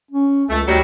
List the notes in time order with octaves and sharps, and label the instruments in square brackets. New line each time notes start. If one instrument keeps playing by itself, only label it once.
[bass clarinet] C#4
[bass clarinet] C#2 [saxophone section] A3
[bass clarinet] D2 [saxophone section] D#3 F#3 G3